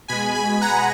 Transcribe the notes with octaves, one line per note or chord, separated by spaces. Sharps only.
B2 G#3 G#5 B5
G#5 B5
F#5 A#5